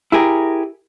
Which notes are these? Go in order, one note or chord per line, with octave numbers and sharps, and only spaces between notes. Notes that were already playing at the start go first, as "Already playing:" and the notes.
E4 G4 G#4 A#4